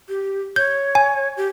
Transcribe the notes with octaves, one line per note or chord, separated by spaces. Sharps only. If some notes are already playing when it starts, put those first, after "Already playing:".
G4
C#5 G6
G#5
G4